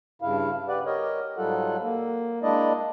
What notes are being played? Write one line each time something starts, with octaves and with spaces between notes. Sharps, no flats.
G2 C#3 E4 F5
G4 B4 D5 F#5
G4 A#4 C#5 D#5
G#2 F#3 G3 F4 A4 F#5
A#3
G#3 A#3 D4 E4 D5 D#5